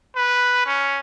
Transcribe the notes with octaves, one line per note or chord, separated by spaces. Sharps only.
B4
C#4